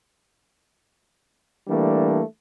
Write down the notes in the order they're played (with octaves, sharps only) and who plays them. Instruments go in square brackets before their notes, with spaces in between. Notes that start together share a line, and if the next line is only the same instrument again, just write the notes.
[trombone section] E3 G3 A3 A#3 D4